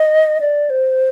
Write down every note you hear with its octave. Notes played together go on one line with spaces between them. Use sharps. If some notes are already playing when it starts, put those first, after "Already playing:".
Already playing: D#5
D5
C5